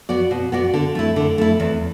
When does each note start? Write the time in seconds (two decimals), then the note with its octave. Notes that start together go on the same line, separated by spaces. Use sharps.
0.09 B3 F#4 D5
0.31 B2
0.52 B3 F#4 D5
0.74 D3
0.95 A3 E4
1.16 D3
1.38 A3 E4
1.60 E2